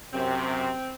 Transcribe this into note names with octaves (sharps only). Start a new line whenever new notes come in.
F#2 C3 C4